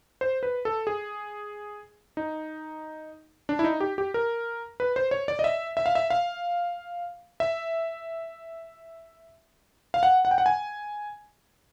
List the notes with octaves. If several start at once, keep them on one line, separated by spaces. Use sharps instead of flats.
C5
B4
A4
G#4
D#4
D4
E4
D#4
G4
G4
A#4
B4
C5
C#5
D5
D#5
E5
E5
F5
E5
F5
E5
F5
F#5
F#5
G5
F#5
G#5